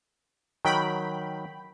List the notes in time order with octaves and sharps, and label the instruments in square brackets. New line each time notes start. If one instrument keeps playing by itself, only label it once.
[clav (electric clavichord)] D#3 F#3 [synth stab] G5 B5